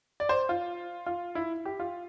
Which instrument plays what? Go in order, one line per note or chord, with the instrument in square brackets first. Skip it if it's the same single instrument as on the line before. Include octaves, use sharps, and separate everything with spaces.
[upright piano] D5
C5
F4
F4
E4
G4
F4